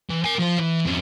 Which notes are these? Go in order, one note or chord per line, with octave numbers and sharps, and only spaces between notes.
E3
A#4 G#5
F3 C5
E3
F2 C#4